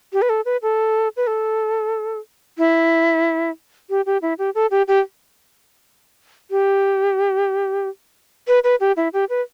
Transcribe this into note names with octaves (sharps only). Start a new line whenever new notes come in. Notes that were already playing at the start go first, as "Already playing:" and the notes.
G4
B4
A4
B4
A4
B4
A4
E4
G4
G4
E4
G4
A4
G4
G4
G4
B4
B4
G4
E4
G4
B4